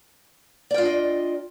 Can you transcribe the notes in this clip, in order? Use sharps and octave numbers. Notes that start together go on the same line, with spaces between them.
D4 F4 D5 D#5 G5